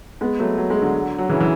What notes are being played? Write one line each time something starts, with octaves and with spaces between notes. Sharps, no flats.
G#3 B3
F#3 A3
F#3
G#3
D3 F#3
F#3
C#3 E3
E3